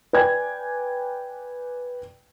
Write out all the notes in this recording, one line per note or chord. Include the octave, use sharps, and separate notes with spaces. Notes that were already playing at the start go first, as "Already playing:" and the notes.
B4 D5 G5 G#5 G#6